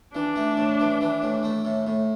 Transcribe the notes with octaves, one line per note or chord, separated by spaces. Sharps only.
E3 D4
A3
A2
E3
E3
A2
A3
A2
A2